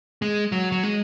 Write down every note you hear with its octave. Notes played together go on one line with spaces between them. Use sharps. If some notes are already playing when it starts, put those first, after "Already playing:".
G#3
F#3
F#3
G#3